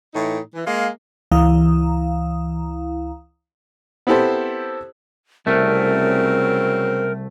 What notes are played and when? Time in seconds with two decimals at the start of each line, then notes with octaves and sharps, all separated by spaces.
0.14 A2 E3 D#4
0.54 E3
0.67 G#3 A#3 F5
1.32 C#2 E3 E4 F5 A#5 D#6
4.07 B3 C4 E4 G4 A4 C5
5.47 C2 C#3 F#3 A3 C4 A#4